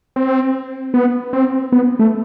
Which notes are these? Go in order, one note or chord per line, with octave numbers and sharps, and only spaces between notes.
C4
B3
C4
B3
A3